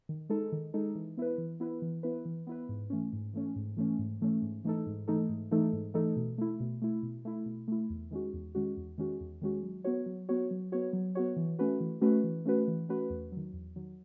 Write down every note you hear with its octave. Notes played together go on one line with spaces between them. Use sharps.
D#3
G#3 D#4 A4
D#3
G#3 D#4 A4
E3
B3 E4 B4
E3
B3 E4 B4
E3
B3 E4 B4
E3
B3 E4 B4
G#2
E3 A3 C#4
G#2
E3 A3 C#4
G#2
E3 A3 C#4
G#2
E3 A3 C#4
G#2
E3 A3 D#4 A4
G#2
E3 A3 D#4 A4
G#2
E3 A3 D#4 A4
G#2
E3 A3 D#4 A4
B2
A3 E4
B2
A3 E4
B2
A3 E4
B2
A3 E4
E2
D#3 G#3 C#4 F#4
E2
D#3 G#3 C#4 F#4
E2
D#3 G#3 C#4 F#4
E2
D#3 G#3 C#4 F#4
F#3
B3 F#4 C#5
F#3
B3 F#4 C#5
F#3
B3 F#4 C#5
F#3
B3 F#4 C#5
E3
A3 C#4 F#4 B4
E3
A3 C#4 F#4 B4
E3
A3 C#4 F#4 B4
E3
A3 C#4 F#4 B4
E2
D#3 F#3
E2
D#3 F#3